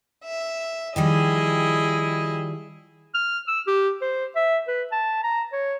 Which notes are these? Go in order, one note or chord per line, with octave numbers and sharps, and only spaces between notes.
E5
D#3 F3 G3 E4 G#4 D#5
F6
E6
G4
C5
E5
B4
A5
A#5
C#5